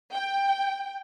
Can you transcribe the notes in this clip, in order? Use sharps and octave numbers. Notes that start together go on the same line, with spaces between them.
G5